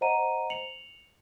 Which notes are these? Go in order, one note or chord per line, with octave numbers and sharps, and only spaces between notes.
C5 D#5 F#5 A#5 D#7
C#7 F7 F#7